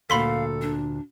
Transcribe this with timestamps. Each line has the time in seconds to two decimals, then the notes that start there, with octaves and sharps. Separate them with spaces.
0.10 D2 A#2 A4 F5 B5 C6 B6
0.62 D4